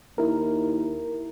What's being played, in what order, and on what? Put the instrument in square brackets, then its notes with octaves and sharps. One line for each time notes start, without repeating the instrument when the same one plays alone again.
[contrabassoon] D#2 [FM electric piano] E4 A#4